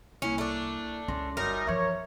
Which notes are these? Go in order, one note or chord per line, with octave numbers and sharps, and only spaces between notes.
C2 A#3 C#4 E4 C#6
A3 D4
C#2 C#4 C6 A#6
G1 F#2 G3 D#4 A#4
E3 F3 C#5 E5